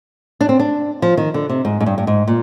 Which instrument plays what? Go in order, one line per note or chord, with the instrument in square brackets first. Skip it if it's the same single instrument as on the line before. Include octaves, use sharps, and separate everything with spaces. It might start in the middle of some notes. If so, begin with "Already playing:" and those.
[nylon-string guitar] D4
C4
D4
F3
D#3
D3
C3
G#2
G#2
G2
G2
G#2
A#2